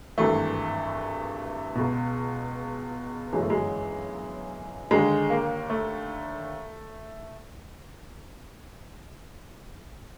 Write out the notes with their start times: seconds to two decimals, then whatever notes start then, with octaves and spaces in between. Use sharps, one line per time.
0.18 G#1 G2 E3 A3
1.75 C#2 B2
3.33 G1 F#2 C#3 E3 G#3
3.42 A3
3.50 G#3
4.91 D#2 D3 G#3
5.30 A#3
5.70 A3